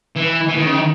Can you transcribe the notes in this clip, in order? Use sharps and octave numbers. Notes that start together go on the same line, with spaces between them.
E3
E3
D#3
C#3
D#3